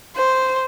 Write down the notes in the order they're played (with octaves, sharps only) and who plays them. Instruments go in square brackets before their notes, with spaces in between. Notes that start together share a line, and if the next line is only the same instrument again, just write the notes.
[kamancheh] C5